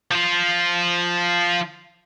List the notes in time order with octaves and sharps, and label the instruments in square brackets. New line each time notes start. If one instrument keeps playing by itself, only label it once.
[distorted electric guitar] F3 F4